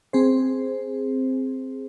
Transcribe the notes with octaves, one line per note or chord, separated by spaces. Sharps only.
C4 G#4 C5